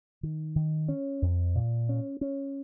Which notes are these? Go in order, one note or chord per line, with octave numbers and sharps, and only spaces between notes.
D#3
D#3
C#4
F2
A#2
C#4
C#4